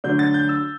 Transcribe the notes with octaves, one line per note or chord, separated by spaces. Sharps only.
D3 F#3 A3 D4 G6
A6
G6
E6